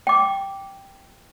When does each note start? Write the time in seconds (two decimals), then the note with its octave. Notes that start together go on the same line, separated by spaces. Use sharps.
0.07 G5 D6